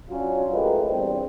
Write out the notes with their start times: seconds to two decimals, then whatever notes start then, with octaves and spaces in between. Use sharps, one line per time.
0.10 F#3 C#4 D4 F4
0.52 C#2 A3 D#4 G4 A#4 B4
0.88 E2 G2 G3 C4